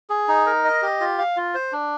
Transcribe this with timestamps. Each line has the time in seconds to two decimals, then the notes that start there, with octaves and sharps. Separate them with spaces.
0.10 G#4
0.28 D#4
0.46 A#4
0.65 D#5
0.82 G4
1.01 F4
1.18 F5
1.37 F4
1.54 C5
1.73 D4